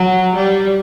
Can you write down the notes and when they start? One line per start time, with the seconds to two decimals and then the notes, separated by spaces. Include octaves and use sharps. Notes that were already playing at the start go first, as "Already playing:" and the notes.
Already playing: F#3
0.36 G3